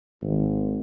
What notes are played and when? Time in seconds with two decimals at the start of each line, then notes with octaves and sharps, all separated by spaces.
0.22 G#1